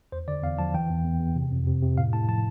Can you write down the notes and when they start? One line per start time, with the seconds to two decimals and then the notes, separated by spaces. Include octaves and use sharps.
0.12 E2 C5
0.28 D3 D5
0.43 E2 F5
0.59 F3 A5
0.74 E3 G5
0.90 E2
1.05 E2
1.20 E2
1.35 C3
1.52 F2
1.67 C3
1.82 C3
1.98 A2 F5
2.13 A2 A5
2.28 F3 A5